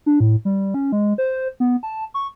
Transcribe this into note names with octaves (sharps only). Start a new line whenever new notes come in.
D4
A2
G3
C#4
G#3
C5
B3
A5
C#6